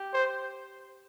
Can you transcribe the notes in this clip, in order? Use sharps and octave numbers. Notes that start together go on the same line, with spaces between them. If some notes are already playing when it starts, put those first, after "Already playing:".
Already playing: G4
C5